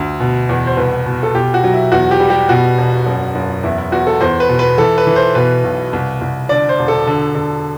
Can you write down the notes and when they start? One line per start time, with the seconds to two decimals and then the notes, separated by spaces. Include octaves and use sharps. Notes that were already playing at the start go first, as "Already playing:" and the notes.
Already playing: D2
0.20 B2
0.49 E2
0.67 C5
0.77 C2 B4
1.06 B2
1.23 A4
1.35 B2 G4
1.54 F#4
1.64 F#3
1.73 E4
1.92 E2 F#4
2.11 G4
2.20 G3
2.30 G4
2.49 B2 F#4
2.78 E1
3.06 F#1
3.35 F#1
3.63 E2 E4
3.78 E4
3.92 E2 F#4
4.07 A4
4.21 E2 C5
4.40 B4
4.49 B2
4.59 B4
4.78 E3 A4
4.98 B4
5.07 E3
5.16 C5
5.35 B2 B4
5.64 B1
5.93 C2
6.21 C2
6.49 D3 D5
6.69 C5
6.79 E1
6.88 A4
7.07 D3
7.35 D3